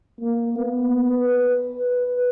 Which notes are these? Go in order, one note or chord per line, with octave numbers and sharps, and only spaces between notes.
A#3
B3
B4